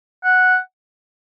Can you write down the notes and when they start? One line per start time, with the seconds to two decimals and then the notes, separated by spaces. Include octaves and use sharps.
0.24 F#5